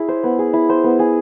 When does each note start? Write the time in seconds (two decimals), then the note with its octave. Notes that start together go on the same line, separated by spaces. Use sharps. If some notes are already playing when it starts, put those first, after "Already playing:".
Already playing: E4 G#4
0.08 C5
0.24 B3
0.39 G#4
0.53 E4
0.69 C5
0.84 B3
0.99 G#4